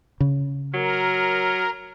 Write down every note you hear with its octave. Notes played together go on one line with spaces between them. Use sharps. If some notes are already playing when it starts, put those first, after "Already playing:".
C#3
F#3 A#4